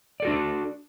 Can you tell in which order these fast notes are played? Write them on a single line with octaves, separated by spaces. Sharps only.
D5 A4 F#4 D4